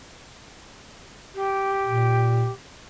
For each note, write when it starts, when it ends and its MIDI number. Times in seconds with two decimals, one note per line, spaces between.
1.35 2.52 67
1.86 2.47 46